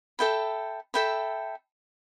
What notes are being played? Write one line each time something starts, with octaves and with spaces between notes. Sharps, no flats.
A4 E5 G5 B5
A4 E5 G5 B5